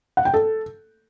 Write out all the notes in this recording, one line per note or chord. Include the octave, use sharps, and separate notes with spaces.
F#5
G5
A4